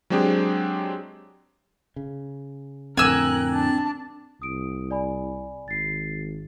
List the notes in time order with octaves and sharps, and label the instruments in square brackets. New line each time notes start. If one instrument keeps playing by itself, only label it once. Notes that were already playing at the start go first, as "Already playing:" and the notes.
[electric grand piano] F#3 G#3 C4 D4 G4 G#4
[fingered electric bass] C#3
[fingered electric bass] F2 A2 D3 [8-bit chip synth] C4 [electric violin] A#4 F#6 [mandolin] G#5 E6
[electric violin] D4 A5
[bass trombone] C2 [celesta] D#6 D7
[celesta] D5 G#5 B5
[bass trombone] G#1 [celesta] A6 C7